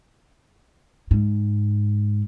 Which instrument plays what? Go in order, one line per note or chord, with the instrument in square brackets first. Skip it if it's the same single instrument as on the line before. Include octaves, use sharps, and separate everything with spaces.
[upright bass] G#2